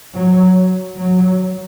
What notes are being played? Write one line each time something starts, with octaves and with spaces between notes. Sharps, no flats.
F#3
F#3